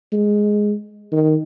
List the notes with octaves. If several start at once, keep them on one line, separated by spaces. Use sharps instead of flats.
G#3
D#3